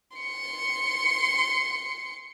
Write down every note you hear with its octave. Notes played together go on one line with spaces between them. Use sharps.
C6 C#7